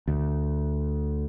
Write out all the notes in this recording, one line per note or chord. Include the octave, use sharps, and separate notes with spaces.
D2